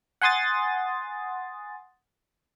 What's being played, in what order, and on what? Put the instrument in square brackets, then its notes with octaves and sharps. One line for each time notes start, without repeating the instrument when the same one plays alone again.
[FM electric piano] F#5 G#5 C6 D#6 A6